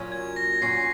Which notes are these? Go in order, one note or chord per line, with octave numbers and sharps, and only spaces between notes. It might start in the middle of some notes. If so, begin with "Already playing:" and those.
Already playing: A#2 F#3 C#4
G#6
A#6
A#2 F#3 C#4 C7